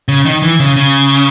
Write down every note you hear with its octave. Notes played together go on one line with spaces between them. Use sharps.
C#3
D#3
E3
C#3
C#3